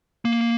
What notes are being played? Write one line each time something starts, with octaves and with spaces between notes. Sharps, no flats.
A#3